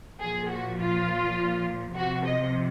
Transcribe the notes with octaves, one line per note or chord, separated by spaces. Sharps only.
A#2 F3 G#4
F#4
F4
C3 F3 F#4
D#5